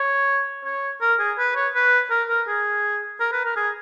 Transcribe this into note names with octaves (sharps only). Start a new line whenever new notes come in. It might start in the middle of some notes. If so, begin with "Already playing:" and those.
Already playing: C#5
C#5
A#4
G#4
B4
C#5
B4
A#4
A#4
G#4
A#4
B4
A#4
G#4